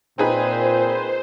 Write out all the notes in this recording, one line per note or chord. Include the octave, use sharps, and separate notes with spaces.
A#2 C4 D#4 G#4 B4 C5